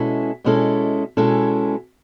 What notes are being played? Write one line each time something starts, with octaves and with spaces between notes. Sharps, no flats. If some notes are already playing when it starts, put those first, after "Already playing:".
Already playing: B2 G#3 C#4 E4 A4
B2 G#3 C#4 E4 A4
B2 G#3 C#4 E4 A4